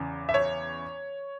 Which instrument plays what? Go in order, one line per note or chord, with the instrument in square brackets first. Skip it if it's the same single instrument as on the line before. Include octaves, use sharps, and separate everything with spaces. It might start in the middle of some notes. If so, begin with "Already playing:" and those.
Already playing: [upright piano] E2 C#3 E3
E5
C#5